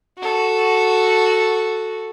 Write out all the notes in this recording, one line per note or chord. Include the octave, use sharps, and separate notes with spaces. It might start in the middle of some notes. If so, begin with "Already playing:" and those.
F#4 A4